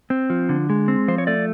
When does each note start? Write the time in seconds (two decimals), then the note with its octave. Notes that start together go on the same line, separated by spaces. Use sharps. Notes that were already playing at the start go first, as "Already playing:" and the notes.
0.10 C4
0.30 F3
0.49 D3
0.70 G#3
0.88 C4
1.08 F3 C5
1.18 C#5
1.27 A3 D5